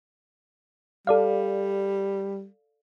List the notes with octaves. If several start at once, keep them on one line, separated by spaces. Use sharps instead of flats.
G3 A4 D5 F5